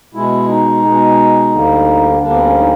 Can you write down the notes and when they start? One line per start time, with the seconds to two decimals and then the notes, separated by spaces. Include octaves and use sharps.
0.14 B2 G#3 E4
0.49 D#4
0.83 B2 G#3
1.53 D2 D3 G3 A#3
2.21 D2 D3 G3 A#3 D4
2.30 B3
2.37 C4
2.44 C#4
2.59 D#4